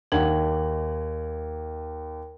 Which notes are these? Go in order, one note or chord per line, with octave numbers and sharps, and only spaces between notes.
D#2 D#4 F#5 G#6 F#7